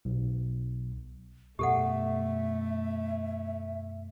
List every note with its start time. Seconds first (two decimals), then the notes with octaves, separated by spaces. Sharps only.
0.05 B1
1.59 F#2 B2 A3 G4 A4 E5 F#5